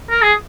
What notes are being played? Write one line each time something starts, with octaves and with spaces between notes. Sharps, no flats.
A#4
G#4